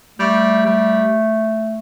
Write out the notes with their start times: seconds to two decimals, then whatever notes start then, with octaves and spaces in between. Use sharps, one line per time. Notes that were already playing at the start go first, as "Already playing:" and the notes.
0.19 G3 A3
0.66 G3